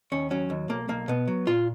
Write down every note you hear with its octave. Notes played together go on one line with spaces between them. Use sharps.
D#2 C#4
F#3 C#4
D#2
B1 A#3
B1 A#3
B2 B3
F#3
A#2 F4